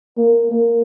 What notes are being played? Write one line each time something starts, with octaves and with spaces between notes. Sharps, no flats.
A#3
A#3